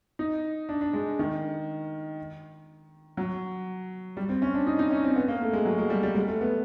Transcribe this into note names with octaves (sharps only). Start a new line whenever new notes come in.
D#4
D4
D4
G#3
D#3
F#3
G3
C4
C#4
D4
D#4
D#4
C#4
C4
B3
A#3
A3
G#3
F#3
G#3
G3
G3
G#3
A3
B3